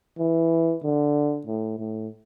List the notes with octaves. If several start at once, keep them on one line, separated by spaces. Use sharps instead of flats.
E3
D3
A2
A2